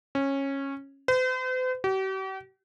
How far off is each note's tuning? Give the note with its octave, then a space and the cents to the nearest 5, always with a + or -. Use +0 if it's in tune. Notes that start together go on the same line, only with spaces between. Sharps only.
C#4 -15
C5 -45
G4 -45